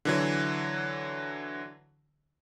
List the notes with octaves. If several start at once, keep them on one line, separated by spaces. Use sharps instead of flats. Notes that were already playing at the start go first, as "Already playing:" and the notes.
D3 E3 F#3